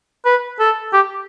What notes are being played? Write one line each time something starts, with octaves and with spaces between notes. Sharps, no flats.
B4
A4
G4